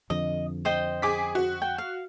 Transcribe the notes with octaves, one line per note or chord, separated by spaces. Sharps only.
F2 D3 F3 D#5
C5 D#5 G5
G#4 D6 B6
F#4
G5
F5